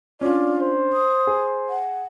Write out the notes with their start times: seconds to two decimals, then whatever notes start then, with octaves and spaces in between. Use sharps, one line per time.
0.21 C#4 D4 F4 D5
0.60 C5
0.93 D#6
1.27 G#4
1.69 F#5